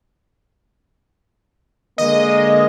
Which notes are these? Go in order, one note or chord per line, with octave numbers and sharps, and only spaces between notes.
D3 G#3 A#3 D#5